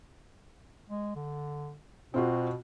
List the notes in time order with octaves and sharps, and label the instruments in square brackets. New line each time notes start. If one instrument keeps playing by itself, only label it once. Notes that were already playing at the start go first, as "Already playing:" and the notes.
[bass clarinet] G#3
D3
[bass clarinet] B2 [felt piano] C4 F4 F#4